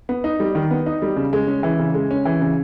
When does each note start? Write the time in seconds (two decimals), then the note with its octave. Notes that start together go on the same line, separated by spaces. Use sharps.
0.09 B3
0.24 D#4
0.40 G3
0.55 D#3
0.71 B3
0.86 D#4
1.02 G3
1.16 C#3
1.33 G#3
1.47 C#4
1.63 E3
1.79 C#3
1.94 G#3
2.11 C#4
2.25 E3
2.41 C#3